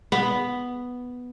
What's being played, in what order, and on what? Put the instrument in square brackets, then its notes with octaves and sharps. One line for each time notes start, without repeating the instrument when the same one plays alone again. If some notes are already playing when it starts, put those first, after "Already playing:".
[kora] B3